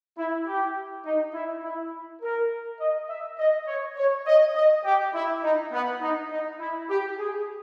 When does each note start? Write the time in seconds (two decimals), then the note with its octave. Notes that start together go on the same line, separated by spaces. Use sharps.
0.18 E4
0.47 G4
1.05 D#4
1.34 E4
1.63 E4
2.22 A#4
2.80 D#5
3.09 E5
3.39 D#5
3.68 C#5
3.97 C#5
4.27 D#5
4.55 D#5
4.84 G4
5.14 E4
5.44 D#4
5.72 B3
6.01 D#4
6.31 D#4
6.60 E4
6.89 G4
7.19 G#4